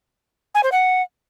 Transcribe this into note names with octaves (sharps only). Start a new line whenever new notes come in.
G#5
C5
F#5